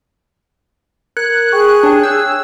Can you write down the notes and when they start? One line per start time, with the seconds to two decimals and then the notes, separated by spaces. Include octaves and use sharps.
1.17 A#4 F#6 G#6 C#7
1.52 G#4 G5 C#6
1.83 D4 G4 C#5 G5
2.03 E6 F#6 G6